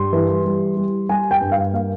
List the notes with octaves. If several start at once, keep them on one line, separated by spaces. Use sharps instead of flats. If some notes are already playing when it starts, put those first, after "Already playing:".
Already playing: G2 G3 C6
E3
G3
G3
G3 G#5
G5
G2
F5
A#3 F5